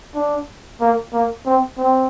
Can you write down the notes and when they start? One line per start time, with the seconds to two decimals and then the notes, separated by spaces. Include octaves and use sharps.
0.16 D4
0.81 A#3
1.13 A#3
1.46 C4
1.78 C4